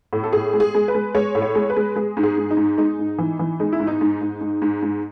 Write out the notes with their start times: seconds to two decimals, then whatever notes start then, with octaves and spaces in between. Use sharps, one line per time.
0.13 A2
0.24 A4
0.33 A2 G#4
0.53 G#3
0.60 G#4
0.75 G#3
0.88 B4
0.95 G#3
1.15 G#3 C#5
1.35 A2
1.42 C#5
1.55 G#3
1.70 B4
1.77 G#3
1.96 G#3 G#4
2.17 G#2
2.23 G#4
2.37 G#2
2.51 D#4
2.57 G#2
2.78 G#3 D#4
2.99 G#2
3.19 E3
3.39 E3
3.60 G#3 D#4
3.72 E4
3.79 G#2
3.87 D#4
4.01 G#2
4.21 G#2
4.41 G#2
4.62 G#2
4.82 G#2